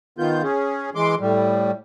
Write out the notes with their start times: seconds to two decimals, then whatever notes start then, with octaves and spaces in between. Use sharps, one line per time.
0.18 D#3 B3 F4 G6
0.43 C#4 G#4
0.95 E3 G#3 C6 D6
1.20 A2 G3